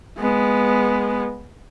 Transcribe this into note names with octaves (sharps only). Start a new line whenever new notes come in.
G#3 B3